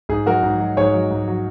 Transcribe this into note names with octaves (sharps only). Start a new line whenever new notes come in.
G#2 G#4
F#3 F#4 A#4
G#2
F#3
G#2 G#4 C#5
F#3
G#2
F#3